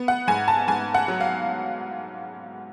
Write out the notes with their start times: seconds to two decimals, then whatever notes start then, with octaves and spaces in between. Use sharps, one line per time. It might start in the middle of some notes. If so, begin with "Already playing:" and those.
Already playing: B3
0.08 F#5
0.28 G#2 G#5
0.48 A5
0.67 G#2 G#5
0.94 F#5
1.08 F#3
1.20 F5